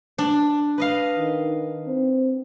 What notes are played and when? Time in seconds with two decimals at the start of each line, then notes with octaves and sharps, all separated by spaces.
0.18 D4
0.78 B4 D#5 F5
1.19 D#3
1.88 C4